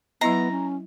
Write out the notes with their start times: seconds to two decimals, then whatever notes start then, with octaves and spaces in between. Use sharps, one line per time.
0.21 F#3 B3 E4 D#5 A#5
0.51 C#4